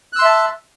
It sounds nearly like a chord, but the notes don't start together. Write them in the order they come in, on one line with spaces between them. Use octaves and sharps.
F#6 E6 C6 E5 A5